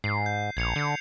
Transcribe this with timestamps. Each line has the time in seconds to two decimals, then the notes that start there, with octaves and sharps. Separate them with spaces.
0.04 G#2 C7
0.26 G6
0.57 A#1 G#6 C#7 F7
0.76 D3